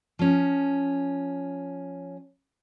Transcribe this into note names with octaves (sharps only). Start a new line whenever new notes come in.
F3 C#4